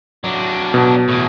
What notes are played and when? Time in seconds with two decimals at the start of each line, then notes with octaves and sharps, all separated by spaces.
0.24 F#3 D4
0.74 B2
1.08 E2 A2